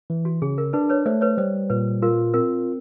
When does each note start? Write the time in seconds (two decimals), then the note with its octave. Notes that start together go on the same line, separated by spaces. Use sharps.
0.10 E3
0.25 F#4
0.42 C#3 G#4
0.58 A#4
0.73 D4 B4
0.89 B4 C#5
1.06 A3 C5 D5
1.21 B4 C#5
1.38 G3 C5
1.70 A#2 B4
2.02 F4 A#4
2.34 C4 A#4